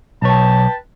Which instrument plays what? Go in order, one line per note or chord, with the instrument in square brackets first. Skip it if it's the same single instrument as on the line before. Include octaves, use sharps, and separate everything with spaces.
[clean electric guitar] B1 C#5 [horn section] B4 G5 A5